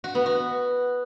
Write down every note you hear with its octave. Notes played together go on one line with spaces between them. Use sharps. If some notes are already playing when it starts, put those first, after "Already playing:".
F#4
B3
F#4